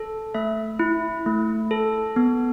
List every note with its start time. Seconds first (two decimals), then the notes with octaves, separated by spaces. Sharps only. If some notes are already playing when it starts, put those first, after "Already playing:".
Already playing: A4
0.34 A3 E5
0.79 E4
1.26 A3
1.71 A4
2.16 B3